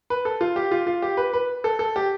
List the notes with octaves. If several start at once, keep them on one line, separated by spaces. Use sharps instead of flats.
B4
A4
F4
G4
F4
F4
G4
B4
B4
A4
A4
G4